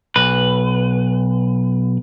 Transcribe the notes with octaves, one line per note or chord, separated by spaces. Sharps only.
B1 B4